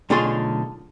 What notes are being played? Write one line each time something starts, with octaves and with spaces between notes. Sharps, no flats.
B1 D3 A3 F4 G#4 C6